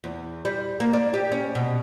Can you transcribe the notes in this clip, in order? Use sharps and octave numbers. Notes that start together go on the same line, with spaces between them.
E2
G3
A#3
D4
G4
C#4
B2